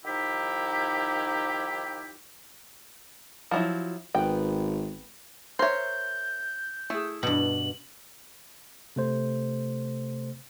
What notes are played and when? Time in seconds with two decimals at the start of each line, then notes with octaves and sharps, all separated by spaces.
0.06 D#3 F3 D#4 E4 G4
3.51 F3 F#3 E4
4.15 G#1 B3 G5
5.59 A#4 C5 C#5 E5 G6
6.90 A3 E4 G#4
7.23 G2 B2 F#7
8.96 C3 A3 C5